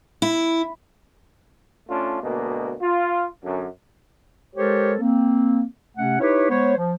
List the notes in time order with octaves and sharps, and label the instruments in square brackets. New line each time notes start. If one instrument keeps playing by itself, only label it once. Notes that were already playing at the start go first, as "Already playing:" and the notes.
[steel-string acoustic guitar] E4
[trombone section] A3 C#4 D4 F4
D2 B2 G#3 A#3
F4
F#2 D3
[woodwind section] G#3 G4 A4 A#4 C5 C#5
A#3 C4
C3 A3 C#4 F#5
D#4 E4 G4 B4 C#5
G#3 B3 C5 C#5
F3